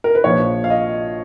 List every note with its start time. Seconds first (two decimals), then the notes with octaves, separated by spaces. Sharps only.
0.04 A#4
0.15 B4
0.24 A#1 A#2 F3 C#5
0.64 F5
0.70 D#5